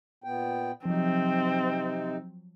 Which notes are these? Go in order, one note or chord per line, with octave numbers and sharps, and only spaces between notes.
A#2 B3 G5
C3 F3 F#3 C4 D#4